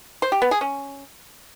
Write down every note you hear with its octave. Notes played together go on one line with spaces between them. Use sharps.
C5
G4
B3
G#4
C#4